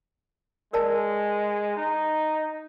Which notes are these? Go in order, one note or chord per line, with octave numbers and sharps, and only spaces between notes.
G#3 A#4 D5 A5
D#4